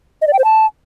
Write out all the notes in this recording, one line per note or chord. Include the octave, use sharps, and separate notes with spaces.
D#5
D5
G5
C5
A5